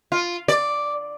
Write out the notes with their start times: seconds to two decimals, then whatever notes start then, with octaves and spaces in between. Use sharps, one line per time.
0.12 F4
0.48 D5